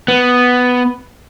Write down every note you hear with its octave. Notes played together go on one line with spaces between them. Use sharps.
B3